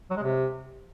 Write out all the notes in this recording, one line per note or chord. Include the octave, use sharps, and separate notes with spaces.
F#3
G#3
C3